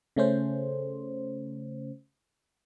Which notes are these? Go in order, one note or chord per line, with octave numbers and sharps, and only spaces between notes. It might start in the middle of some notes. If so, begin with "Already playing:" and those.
C#3 A3 C#4 C5